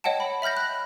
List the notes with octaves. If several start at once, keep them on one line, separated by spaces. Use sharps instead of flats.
C#5 D#5 F#5 G5 A5
B5
E5 B5 F6 G6 A#6
F#6